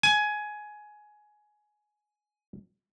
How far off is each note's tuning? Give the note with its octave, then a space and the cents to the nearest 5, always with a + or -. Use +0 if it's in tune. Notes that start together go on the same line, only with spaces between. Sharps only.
G#5 +15